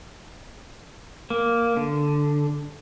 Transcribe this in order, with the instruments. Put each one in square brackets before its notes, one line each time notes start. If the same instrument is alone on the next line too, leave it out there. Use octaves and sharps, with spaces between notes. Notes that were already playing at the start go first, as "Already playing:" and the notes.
[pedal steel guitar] A#3
D3